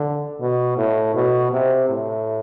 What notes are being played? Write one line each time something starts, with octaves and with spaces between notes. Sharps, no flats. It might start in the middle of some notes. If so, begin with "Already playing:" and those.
Already playing: D3
B2
A2
B2
C3
A2